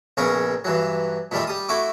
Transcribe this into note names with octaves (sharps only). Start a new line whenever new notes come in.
A#1 C#3 B3 A#4 C#5 C#6
G2 E3 F#3
A#2 D#3 G3 A3 F4
G3 D#6
A3 E4 F#4 E5 D6